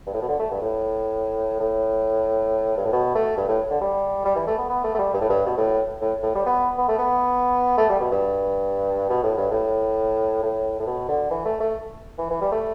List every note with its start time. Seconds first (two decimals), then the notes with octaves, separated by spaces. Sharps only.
0.06 G2
0.14 A2
0.21 B2
0.28 D3
0.39 A3
0.51 G2
0.62 A2
1.60 A2
2.77 G2
2.85 A2
2.92 B2
3.15 A3
3.37 G2
3.48 A2
3.70 D3
3.81 G3
4.25 G3
4.36 E3
4.47 A3
4.58 B3
4.69 B3
4.84 A3
4.94 A3
4.99 G3
5.13 G2
5.21 A2
5.29 G2
5.46 B2
5.57 A2
6.01 A2
6.23 A2
6.35 G3
6.46 B3
6.78 B3
6.88 A3
6.98 B3
7.77 A3
7.89 G3
8.00 B2
8.11 G2
9.09 B2
9.23 A2
9.37 G2
9.51 A2
10.43 A2
10.80 A2
10.86 B2
11.08 D3
11.31 E3
11.45 A3
11.60 A3
12.18 E3
12.30 E3
12.41 G3
12.52 A3